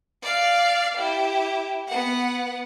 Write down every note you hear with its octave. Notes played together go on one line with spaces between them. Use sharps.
D5 F5
E4 G4
B3 F#5